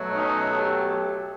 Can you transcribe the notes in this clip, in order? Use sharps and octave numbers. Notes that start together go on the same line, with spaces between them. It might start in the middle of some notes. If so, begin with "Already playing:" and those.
Already playing: B2 F#3 A3
C#4 D#4
G4 A4